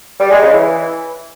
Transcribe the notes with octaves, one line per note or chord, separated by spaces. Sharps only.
G3
G#3
C#3
E3